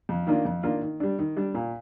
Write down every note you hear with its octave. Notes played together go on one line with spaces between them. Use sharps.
F2
D#3 A#3 D4 F4
F2
D#3 A#3 D4 F4
D#3
G3 D4
D#3
G3 D4
A#2